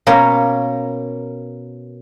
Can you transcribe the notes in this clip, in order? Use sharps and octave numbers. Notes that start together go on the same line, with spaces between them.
B2 A#3 C#4 C#5 G5